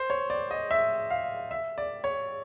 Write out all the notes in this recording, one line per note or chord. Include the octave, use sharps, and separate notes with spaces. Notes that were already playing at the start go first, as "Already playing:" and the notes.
Already playing: C5
C#5
D5
D#5
E5
F5
E5
D5
C#5